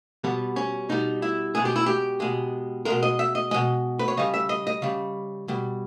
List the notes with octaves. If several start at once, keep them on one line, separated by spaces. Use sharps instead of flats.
B2 G3 B3
C#4
B2 G3 D#4
E4
B2 G#3 G#4
G4
E4
G4
B2 G#3
B2 G#3 A#4
D#5
E5
D#5
B2 G#3 D#5
B4
C#5
C#3 G3 D#5
E5
D#5
D#5
C#3 G3
B2 G3